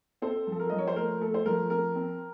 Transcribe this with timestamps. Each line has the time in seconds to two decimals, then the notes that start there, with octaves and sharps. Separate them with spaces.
0.22 C4 A4 C5
0.47 F3 A4
0.59 A#4
0.70 F3 D#5
0.78 C#5
0.88 C5
0.96 A3 A#4
1.20 A3 A4
1.34 C5
1.46 F3 A#4
1.70 C4 A#4
1.96 C4